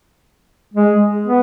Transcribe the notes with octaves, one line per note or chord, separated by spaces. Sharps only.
G#3
B3